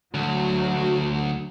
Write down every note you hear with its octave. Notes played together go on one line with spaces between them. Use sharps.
D2 F#3